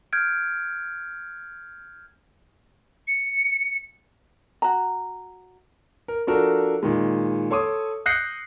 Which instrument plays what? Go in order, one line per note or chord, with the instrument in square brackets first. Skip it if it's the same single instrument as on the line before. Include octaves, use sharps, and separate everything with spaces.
[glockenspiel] F6 G6 G#6 D7
[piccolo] C#7
[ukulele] F#4 A#5
[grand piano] A#4
F3 D4 F#4 A4 A#4
A#2 D#3 G#3
A4 C#5 C6 D6 D#6
D#6 F#6 G6 A#6 C7 C#7